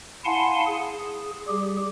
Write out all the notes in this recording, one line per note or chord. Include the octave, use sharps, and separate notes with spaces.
E4 F5 F#5 G#5 A5 C6
G#4
G3 G4 G#4